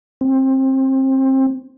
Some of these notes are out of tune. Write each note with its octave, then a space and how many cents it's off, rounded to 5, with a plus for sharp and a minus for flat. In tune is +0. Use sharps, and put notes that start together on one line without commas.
C4 +25